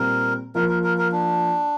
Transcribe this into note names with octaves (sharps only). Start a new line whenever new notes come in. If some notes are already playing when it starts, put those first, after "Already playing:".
Already playing: A#2 G3 C4 A#4
F3 A#3 F4 A#4
A#4
A#4
A#4
D4